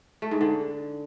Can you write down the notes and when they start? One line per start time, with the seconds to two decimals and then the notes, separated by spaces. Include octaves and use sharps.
0.22 A3
0.31 G#2
0.41 D3